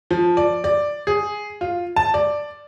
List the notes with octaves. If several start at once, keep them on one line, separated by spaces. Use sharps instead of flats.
F3
D5
D5
G#4
F4
A5
D5